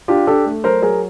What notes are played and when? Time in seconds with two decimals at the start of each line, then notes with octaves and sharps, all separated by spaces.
0.08 D4 F4 G4
0.27 D4 G4 A4
0.45 A3
0.64 F#3 A#4 C5
0.82 F#3 G#4 A#4